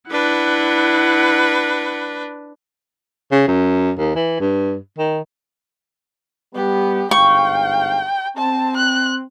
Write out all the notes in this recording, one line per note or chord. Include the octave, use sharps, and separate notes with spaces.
D4 E4 B4 F#5
C#3
F#2
D#2
E3
G2
D#3
G3 B3 G4
G1 G#2 F5 G5 C#6
C4 A5
F#6